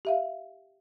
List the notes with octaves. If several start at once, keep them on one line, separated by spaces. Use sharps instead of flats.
G4 E5 F5